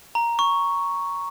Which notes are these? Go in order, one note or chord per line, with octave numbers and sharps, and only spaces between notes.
A#5
C#6